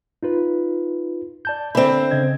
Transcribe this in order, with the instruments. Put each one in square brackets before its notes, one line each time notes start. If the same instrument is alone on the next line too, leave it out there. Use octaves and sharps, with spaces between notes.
[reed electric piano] D#4 F4 B4
D5 A5 G6
[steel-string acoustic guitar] D3 C4 [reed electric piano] D5 E5 B5
[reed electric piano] C#3 D#5 G#6